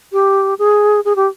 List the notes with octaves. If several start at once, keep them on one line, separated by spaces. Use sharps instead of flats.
G4
G#4
G#4
G4